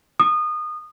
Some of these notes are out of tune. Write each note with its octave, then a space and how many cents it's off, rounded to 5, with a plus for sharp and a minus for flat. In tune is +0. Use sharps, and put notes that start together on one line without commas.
D#6 -25